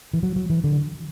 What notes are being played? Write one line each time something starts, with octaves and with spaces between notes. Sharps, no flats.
E3
F#3
F#3
E3
D3